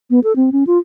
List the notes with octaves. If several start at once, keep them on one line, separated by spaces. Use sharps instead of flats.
B3
A4
C4
C#4
F4